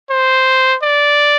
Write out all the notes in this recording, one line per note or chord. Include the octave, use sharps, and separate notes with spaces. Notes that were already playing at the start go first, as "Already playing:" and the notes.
C5
D5